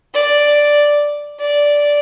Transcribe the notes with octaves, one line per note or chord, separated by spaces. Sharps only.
D5
D5